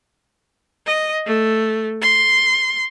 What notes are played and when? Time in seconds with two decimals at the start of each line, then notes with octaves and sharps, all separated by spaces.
0.86 D#5
1.26 A3
2.02 C6